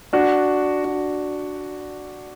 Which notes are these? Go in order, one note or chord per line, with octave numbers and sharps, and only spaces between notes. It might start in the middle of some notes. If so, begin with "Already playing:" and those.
D4 F#4
D4 F#4